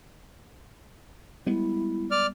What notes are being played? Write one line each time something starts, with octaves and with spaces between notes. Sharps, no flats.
G3 G#3 B3 E4
D5 F6